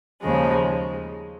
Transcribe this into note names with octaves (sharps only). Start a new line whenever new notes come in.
D#2 C#3 F3 G#3